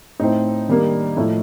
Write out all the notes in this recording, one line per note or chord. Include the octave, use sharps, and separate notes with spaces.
A2 A3 C4 D#4
D#3 G3 A#3 D4
A2 F3 A3